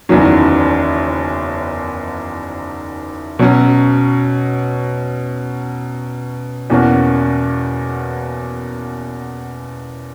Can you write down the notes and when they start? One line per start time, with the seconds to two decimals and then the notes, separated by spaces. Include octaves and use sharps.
0.09 F#1 E2 D#3 F#3 C#4
3.39 B2 F#3 C#4
6.70 E2 B2 A#3 C#4 F#4